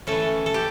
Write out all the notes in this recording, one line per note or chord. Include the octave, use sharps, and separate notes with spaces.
E3 A3 C#4 A4
A4
G4